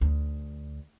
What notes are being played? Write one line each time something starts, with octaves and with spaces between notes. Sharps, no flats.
D2